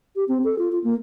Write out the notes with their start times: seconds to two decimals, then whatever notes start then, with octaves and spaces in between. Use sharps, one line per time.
0.16 G4
0.28 C4
0.44 A4
0.59 F4
0.72 F4
0.84 A#3